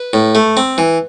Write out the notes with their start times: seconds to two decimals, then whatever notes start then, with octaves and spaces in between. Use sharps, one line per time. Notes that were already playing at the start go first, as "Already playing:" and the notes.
Already playing: B4
0.13 A2
0.35 A3
0.57 C4
0.78 E3